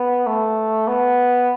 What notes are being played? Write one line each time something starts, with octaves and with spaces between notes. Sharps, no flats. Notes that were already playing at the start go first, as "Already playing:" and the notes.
Already playing: B3
A3
B3